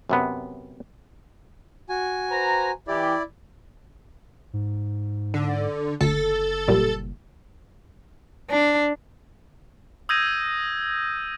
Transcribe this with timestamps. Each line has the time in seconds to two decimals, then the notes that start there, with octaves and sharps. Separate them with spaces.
0.09 F#2 C3 B3
1.89 F#4 G#5
2.29 B4 C5 A#5
2.87 E3 E4 G4 D5
4.53 G#2
5.34 D3
6.01 F#1 D2 A4
6.68 B1 A#2 G3
8.50 D4
10.09 D#6 E6 G6 G#6 A#6 D#7